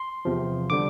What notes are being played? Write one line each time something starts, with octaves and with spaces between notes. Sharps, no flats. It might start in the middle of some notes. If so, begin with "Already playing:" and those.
Already playing: C6
E2 C3 F3
D3 G3 D6